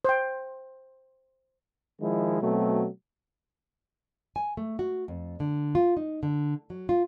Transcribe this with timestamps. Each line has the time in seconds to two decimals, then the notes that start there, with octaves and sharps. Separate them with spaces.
0.05 C5 G5
2.00 D#3 F3 G#3 E4
2.42 B2 F#3 A3 C4
4.36 G#5
4.57 A3
4.79 F#4
5.08 F2
5.40 D3
5.75 F4
5.97 D#4
6.23 D3
6.70 F#3
6.89 F4